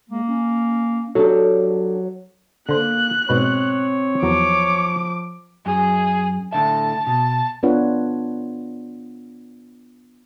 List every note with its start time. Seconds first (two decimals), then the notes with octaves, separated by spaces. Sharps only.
0.09 G#3 A#3
0.27 C#4
1.15 F#3 D4 G4 A4
2.69 D3 A#3 C5 F#6
3.29 G#2 B2 C4 B4 C#5
4.23 E2 F3 F#3 D6
5.66 F#2 G#4
6.53 A2 D3 E5 A5
7.07 B2 A5
7.63 B3 D4 F4 B4 C#5 F#5